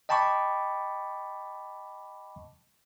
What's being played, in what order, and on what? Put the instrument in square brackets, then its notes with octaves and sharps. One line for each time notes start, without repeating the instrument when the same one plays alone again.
[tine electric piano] D#5 G5 A5 B5 C#6 D6